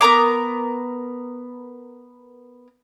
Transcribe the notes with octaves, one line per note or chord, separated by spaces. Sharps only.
B3 A#4 A#5 D6